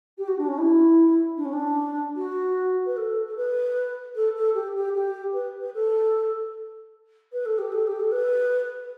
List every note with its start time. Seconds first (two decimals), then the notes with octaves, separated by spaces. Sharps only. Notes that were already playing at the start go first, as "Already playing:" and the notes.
0.17 G4
0.27 F#4
0.38 D4
0.48 C#4
0.58 E4
1.37 D4
1.45 C#4
1.52 D4
2.16 F#4
2.85 B4
2.96 A4
3.26 A4
3.36 B4
4.15 A4
4.35 A4
4.54 G4
4.75 G4
4.94 G4
5.33 B4
5.60 B4
5.74 A4
7.32 B4
7.45 A4
7.58 G4
7.71 A4
7.87 G4
7.99 A4
8.11 B4